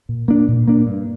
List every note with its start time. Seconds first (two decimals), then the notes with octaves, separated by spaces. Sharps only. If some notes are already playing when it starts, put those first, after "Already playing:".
0.09 A#2
0.28 A#3 D4
0.48 A#2
0.68 A#3 D4
0.87 G2